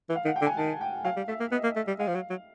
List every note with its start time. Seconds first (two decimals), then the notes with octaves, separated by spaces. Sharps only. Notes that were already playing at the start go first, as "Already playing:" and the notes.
0.10 E3
0.16 F5
0.25 D#3 F#5
0.36 G5
0.41 D3
0.46 G#5
0.57 D#3 A5
0.81 G5
1.04 F#3 F5
1.16 G3
1.28 A3 E5
1.40 A#3
1.52 B3 D#5
1.64 A#3
1.76 A3
1.87 G3
1.99 G#3 F5
2.08 F3
2.15 F#3
2.30 F#3